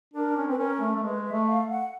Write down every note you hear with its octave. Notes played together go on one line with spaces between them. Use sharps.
D4 A#4
C#4
C4 B4
C#4 A#4
A3
A3
G#3 B4
E5
A3
F5
F#5